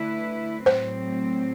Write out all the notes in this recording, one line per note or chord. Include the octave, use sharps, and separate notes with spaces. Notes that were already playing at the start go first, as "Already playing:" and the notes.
Already playing: D3 A3 E4 B4
A2 F#3 C4 C5